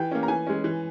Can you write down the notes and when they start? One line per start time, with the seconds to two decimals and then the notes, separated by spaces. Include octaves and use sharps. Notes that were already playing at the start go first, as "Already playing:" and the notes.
Already playing: E3 G5
0.11 A#3 C#4
0.23 A#5
0.28 E3 G#5
0.47 G#3 C#4
0.64 E3